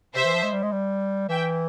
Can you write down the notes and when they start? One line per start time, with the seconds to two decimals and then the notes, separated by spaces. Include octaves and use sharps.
0.15 C3 C5 E5
0.24 E3
0.34 F3
0.43 G#3
0.52 G3
0.63 G#3
0.72 G3
1.29 E3 E5 G5